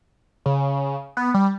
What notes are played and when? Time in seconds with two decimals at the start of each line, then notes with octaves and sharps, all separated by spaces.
0.46 C#3
1.17 B3
1.34 G3